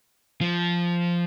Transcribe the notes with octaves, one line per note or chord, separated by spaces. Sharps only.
F3